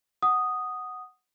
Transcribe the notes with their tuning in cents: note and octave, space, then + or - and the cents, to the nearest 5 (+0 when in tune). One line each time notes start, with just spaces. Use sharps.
F#5 +0 D#6 -5